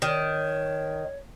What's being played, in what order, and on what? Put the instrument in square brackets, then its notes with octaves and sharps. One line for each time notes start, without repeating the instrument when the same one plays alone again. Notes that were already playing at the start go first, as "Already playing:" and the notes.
[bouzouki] D#3 [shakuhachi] C#5